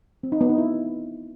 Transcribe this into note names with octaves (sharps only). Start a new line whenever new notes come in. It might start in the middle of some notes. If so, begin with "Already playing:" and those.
C4
D#4
B3
D#4
E4